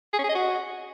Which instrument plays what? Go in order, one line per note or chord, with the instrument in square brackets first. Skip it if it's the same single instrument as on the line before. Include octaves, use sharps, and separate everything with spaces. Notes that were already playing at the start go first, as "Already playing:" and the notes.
[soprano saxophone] G#4
C#4
G#4
D#5
F#4